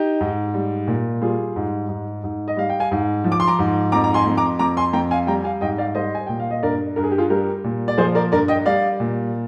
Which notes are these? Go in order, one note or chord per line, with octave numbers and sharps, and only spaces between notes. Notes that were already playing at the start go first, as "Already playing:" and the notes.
Already playing: D#4 G4
G#2
G3
A#2
G3 F4 G#4
G#2
G#2
G#2
D#5
G3 F5
G5
F5 G#5
G#2
F3
D6
C6
A#5 D6
G#2
F2 A#5 D6
A#5
G#5 C6
F2
A#5 D6
F2 A#5 D6
G#5 C6
F2 G5 A#5
F5 G#5
G3 G5 A#5
F5 G#5
G#2 D#5 G5
D5 F5
G3 C5 D#5
G#5
A#2 G5
F5
D#5
G2 A#4 D5
G2 A#4
G#4
G4
F4 G#4
G3 G4 A#4
A#2
D5
F3 G#4 C5
A#4 D5
G2 A#4 D5
D#5 G5
G3 D5 F5
A#2